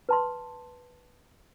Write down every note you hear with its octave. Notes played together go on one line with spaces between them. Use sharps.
B4 A5 C6